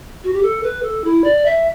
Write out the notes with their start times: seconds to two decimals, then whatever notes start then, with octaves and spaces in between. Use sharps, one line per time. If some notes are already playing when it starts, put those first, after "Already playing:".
0.24 F#4
0.34 G4
0.43 A4
0.63 B4
0.83 A4
1.04 E4
1.24 D5
1.46 E5